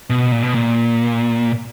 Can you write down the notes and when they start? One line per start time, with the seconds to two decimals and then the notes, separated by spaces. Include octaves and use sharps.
0.10 B2
0.32 A#2
0.43 B2
0.55 A#2